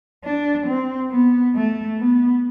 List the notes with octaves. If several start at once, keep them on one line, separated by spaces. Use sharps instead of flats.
D4
C4
B3
A3
B3